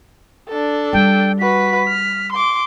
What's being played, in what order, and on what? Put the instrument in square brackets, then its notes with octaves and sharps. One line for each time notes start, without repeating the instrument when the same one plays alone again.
[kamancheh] D4 A4
[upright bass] G3 [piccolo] G5
[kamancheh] F#4 B4 [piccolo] B6
[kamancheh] F6
C6 D6